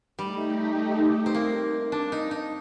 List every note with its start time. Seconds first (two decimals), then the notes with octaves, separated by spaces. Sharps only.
0.19 G3 A3 D#4 G4
1.26 C4
1.35 A#3
1.92 D4
2.12 D#4
2.31 D#4